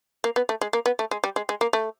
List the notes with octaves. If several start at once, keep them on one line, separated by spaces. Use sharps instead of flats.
A#3
B3
A3
G#3
A#3
B3
A3
G#3
G3
G#3
G#3
A#3
A3